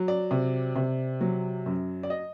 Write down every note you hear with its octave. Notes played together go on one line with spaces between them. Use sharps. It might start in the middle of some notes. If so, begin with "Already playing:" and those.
Already playing: F#3
D5
C3
C3
F#3
F#2
D5
D#5